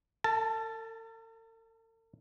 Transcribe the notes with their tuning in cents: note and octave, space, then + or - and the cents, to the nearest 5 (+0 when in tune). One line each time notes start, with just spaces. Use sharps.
A4 +45 A5 +0